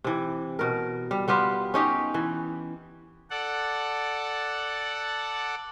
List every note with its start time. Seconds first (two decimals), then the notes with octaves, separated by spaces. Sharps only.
0.04 C3 E3
0.59 B2 A#4
1.11 G3
1.28 G3 B3 F4 G4
1.74 C#4 D#4 G4
2.14 E3
3.31 A4 D5 F#5